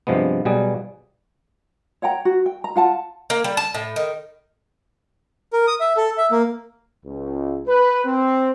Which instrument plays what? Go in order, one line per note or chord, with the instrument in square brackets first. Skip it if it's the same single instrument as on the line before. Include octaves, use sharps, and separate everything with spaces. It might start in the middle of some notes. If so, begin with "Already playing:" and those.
[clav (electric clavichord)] G2 C3 F3 G#3 B3
B2 F#3 G3 G#4
[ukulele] C#5 F#5 G5 A#5
F#4
G5
A#5
F4 F#5 A5
[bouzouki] A#3
G3
A5
A2
D#3
[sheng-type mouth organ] A#4
D#6
E5
A4
E5
A#3
[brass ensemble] C#2
B4
C4